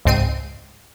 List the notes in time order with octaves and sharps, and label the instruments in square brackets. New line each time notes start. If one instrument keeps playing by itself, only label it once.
[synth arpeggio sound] C#2 G#2 C4 C7 D7 D#7